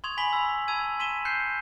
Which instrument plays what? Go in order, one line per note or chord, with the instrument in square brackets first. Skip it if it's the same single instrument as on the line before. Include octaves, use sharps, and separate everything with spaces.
[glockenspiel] C6 C#6 D#6 G#6 F7
G#5 B5 B6 F#7 G7
B5 E6
A5 B5 E6 G#6 D#7
C6 B6 D#7 E7 G7
F#6 G6 C7 C#7